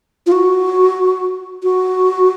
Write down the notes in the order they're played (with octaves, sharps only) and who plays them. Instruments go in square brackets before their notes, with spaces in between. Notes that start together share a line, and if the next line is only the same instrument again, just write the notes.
[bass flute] F4
F#4
F#4